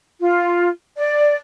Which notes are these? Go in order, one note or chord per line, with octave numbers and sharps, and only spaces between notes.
F4
D5